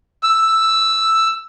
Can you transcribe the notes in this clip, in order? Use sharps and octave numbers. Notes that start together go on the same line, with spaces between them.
E6